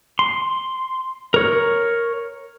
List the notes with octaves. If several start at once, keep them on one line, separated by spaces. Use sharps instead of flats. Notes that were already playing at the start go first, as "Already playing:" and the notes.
C6
A#4 C#5